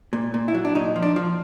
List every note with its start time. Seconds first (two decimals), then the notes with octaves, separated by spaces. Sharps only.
0.13 A#2
0.34 A#2
0.48 E4
0.54 F#3
0.65 D4
0.75 A#2 D#4
0.96 F3
1.02 D4
1.16 F3